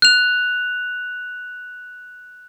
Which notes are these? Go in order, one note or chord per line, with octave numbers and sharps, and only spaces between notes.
F#6 F7